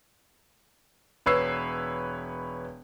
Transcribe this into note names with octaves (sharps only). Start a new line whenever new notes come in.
E1 B4 C#5 E6 C7